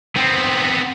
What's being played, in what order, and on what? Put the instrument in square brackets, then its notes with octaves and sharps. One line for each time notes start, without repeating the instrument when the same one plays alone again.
[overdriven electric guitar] B3 C4